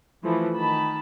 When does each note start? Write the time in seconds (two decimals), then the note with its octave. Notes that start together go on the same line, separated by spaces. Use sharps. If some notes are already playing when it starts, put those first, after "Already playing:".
0.23 E3 F3 A3
0.55 D#3 A5 B5